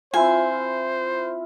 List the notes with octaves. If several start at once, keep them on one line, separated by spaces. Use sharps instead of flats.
C4 E4 F4 C5 G#5